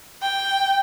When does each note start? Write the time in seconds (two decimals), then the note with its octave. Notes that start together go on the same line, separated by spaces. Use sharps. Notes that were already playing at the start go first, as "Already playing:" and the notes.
0.22 G5